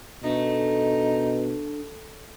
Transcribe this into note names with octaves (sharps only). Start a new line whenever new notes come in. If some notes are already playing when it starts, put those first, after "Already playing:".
B2 A3 D4 D#4